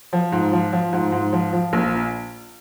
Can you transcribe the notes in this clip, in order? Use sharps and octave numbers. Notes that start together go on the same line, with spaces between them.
F3
G#2
F3
F3
G#2
G#2
F3
F3
A#1